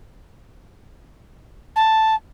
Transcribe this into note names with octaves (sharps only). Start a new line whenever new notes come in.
A5